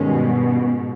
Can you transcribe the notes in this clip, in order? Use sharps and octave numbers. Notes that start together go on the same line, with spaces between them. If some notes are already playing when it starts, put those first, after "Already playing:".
Already playing: G2 B2 D#3 G#3 C#4
G#2